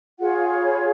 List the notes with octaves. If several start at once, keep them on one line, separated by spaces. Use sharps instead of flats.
F4 G#4 C#5 F#5
F5
B5